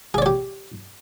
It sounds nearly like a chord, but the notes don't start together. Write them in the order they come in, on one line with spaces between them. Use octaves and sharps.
G#4 D5 C#5 G4